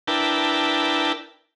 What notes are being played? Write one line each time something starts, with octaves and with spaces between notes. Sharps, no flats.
D4 E4 A#4 B4 G5 A5